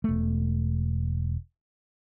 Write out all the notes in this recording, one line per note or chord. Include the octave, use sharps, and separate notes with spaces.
E1 A3